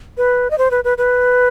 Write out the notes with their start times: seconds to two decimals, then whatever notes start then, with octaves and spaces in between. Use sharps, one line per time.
0.18 B4
0.51 D#5
0.58 C5
0.71 B4
0.84 B4
0.98 B4